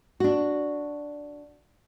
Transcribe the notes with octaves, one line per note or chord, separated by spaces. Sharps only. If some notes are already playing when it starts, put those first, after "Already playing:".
D4 F#4